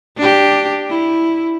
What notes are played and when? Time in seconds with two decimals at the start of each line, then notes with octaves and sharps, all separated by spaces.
0.17 D4 G4
0.90 E4